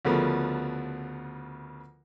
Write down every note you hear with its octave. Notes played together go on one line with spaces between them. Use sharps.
D2 C#3 F3 A3 B3 A#4